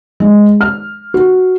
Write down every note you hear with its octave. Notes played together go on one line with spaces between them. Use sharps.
G#3
F6
F#4